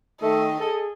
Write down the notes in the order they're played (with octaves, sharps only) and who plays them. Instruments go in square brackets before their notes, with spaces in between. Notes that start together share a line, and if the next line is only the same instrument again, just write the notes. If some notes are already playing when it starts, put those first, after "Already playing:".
[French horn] D#3 [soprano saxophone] A3 [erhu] D#5
[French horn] G#4 [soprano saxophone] A4